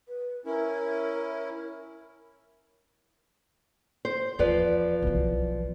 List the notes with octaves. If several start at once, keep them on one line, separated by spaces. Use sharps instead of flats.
B4
C#4 E4 A#4
C5
E2 F3 B4 D5
B1 E3